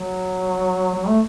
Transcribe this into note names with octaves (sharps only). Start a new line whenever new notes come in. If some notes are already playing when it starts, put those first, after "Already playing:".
Already playing: F#3
F#3
A3